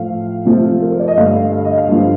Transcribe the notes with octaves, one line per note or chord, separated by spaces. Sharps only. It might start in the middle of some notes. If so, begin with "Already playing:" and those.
Already playing: A2 F3 A3 F5
C3 F3 A3
A#4
C5
D5
D#5
G2 D3 A3 F5
F5
D#5
F5
G2 D3 F3